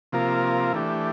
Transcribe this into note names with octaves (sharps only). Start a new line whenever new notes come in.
C3 F3 A#3 F4 A#4
E3 A3 D4 G4